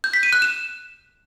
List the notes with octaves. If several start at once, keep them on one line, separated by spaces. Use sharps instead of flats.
G6
B6
D#7
F#6
E7